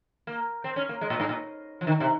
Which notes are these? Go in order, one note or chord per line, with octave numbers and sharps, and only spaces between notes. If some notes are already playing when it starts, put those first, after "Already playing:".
A#3
C4
C#4
A#3
G#3
A#2
G#2
A#2
F3
D#3
C3